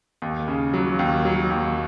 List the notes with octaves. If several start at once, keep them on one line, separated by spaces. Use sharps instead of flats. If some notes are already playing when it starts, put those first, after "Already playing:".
D#2
C#3
F#3
D#2
F#3
D#2